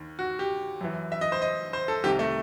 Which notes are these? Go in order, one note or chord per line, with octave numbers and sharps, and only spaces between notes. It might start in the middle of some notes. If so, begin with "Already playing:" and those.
Already playing: D#2 D#3
F#4
G4
F#2 E3
E5
D#5
C5
D#5
C5
A4
C2 C3 D#3 G4
A3